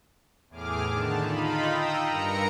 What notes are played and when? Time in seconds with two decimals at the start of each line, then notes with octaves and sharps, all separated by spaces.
0.50 E2 A2 G#4 D6 F6
0.89 D3 D#3 A5
1.22 D#4 F4 B5
1.69 D#5 G5 A#5 D#6 E6
2.08 G2 A#4 A#5 C#7